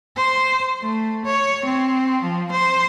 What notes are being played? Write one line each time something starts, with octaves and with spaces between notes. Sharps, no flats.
C5
A3
C#5
C4
F3
C5